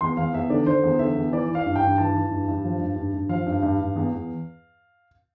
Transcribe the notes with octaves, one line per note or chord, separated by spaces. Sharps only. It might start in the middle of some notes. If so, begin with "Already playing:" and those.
E2 C6
E2 F5
E2 E5
D3 D5
D3 C5
E2
D3 E5
E2
E3 D5
E3
F5
G2
G5
G2
E3 A5
E3
G2
G2
F3
G2
G2
G2
F3 F5
G2
G2
G2
E2
E2